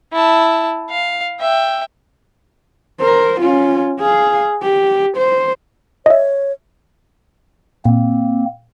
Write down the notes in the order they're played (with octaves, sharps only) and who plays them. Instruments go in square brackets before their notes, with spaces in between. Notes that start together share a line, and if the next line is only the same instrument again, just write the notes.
[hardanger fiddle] E4 A5
F5
E5 G5
[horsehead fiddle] A#4 C5
C#4 F4
G#4 F5
G4
C5
[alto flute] C#5 [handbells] D#5 E5
[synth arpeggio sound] A#2 [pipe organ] A#3 C4